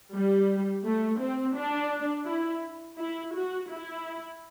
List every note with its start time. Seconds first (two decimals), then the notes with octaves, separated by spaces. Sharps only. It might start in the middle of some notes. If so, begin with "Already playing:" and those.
0.13 G3
0.85 A3
1.20 C4
1.56 D4
2.26 E4
2.99 E4
3.34 F#4
3.70 E4